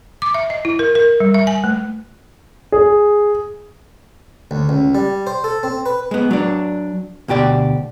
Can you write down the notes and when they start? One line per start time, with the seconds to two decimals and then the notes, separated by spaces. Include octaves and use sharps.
0.22 D6
0.34 E5
0.50 D#5
0.65 E4
0.79 A#4
0.95 A#4
1.20 G3
1.34 E5
1.47 G#5
1.64 A3
2.72 G#4
4.51 D2
4.69 C#2
4.95 G3
5.27 C5
5.44 A4
5.63 C4
5.86 B4
6.11 G#3 B3
6.31 F#3 D4
7.28 D2 B2 G4 D5